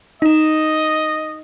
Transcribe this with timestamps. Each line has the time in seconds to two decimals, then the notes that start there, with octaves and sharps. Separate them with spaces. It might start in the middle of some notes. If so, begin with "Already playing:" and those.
0.22 D#4 D#5 E7